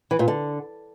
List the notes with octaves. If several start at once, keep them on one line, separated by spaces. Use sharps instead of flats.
E3
A#2
D3